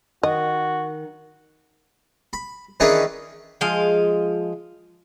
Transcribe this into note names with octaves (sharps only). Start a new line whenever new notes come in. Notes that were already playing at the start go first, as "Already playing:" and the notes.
D#3 F#4 D#5
B5
D#3 E3 C#4 D4 G#4 B4
F3 G#3 D#5 F5